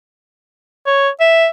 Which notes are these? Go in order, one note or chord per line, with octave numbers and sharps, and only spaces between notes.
C#5
E5